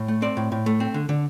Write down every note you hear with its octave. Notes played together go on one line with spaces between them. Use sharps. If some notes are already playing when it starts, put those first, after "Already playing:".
Already playing: A2
A3
C4 D5
A2
A2
A3
C4
D3
D3